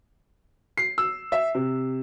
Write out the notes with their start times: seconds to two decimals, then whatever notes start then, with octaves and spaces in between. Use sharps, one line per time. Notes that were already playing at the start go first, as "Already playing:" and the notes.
0.77 C7
0.98 E6
1.32 E5
1.55 C3